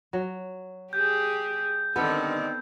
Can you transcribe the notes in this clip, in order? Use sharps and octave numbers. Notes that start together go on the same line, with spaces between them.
F#3
G4 G#4 G6
G2 D3 D#3 B3 C4 A4